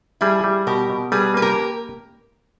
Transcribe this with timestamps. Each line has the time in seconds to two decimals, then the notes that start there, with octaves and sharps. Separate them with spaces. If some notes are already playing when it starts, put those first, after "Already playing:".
0.21 G3 E4 G#4
0.44 G3
0.67 B2 G4 A#4
0.90 B2
1.12 G3 G#4 B4
1.34 A#3 B4
1.42 G4 A#4